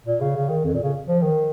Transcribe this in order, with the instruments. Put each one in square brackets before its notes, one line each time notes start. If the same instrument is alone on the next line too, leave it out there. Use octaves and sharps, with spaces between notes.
[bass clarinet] A#2
C#3
C#3
D#3
F2
A#2
C#3
F3
D#3